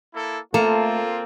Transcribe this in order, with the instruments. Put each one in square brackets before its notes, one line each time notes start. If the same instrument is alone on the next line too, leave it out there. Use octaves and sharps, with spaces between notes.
[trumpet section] A#3 E4 A4
[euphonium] A3 [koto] A#3 [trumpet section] C4 F4 [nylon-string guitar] A4